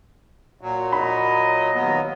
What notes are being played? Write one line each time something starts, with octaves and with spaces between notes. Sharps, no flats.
A#2 F#3
D#5 B5
D#2 F#3 B3